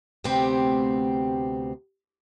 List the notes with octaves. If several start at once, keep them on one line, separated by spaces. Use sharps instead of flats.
D2 C3 A3 B3 C4 G4